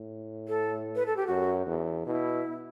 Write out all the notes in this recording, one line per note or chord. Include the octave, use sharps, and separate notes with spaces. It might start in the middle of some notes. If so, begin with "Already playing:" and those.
Already playing: A2
A4
B4
A4
G4
F#2 F#4
E2
B2 E4